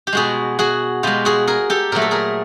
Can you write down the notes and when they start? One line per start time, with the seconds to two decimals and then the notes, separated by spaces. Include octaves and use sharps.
0.07 G4
0.13 B2 G#3 F#4 G#4
0.59 F#4 G#4
1.03 B2 G#3 F4 G4
1.25 F#4 G#4
1.47 G#4 A#4
1.70 G4 A4
1.92 A#2 F#3 A3 A#4
2.02 A4
2.11 G#4 A#4